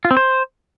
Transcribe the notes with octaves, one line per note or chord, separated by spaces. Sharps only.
F4
C4
C5